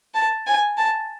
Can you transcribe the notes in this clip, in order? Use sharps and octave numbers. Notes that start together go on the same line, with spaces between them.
A5
G#5
A5